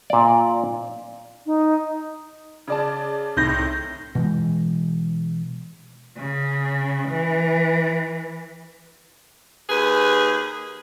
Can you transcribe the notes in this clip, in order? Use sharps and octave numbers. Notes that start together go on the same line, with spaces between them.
A#2 D5
D#4
C#3 D5 A5
C2 A2 C3 D#3 G6 A#6
B2 E3 G#3
C#3
E3
D#2 G#4 B4